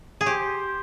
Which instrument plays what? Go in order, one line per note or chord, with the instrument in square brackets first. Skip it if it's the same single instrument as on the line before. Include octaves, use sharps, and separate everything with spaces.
[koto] G#4
[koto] G4 [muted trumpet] C5